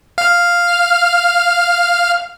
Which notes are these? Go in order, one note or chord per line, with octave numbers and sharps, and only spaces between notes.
F5 F6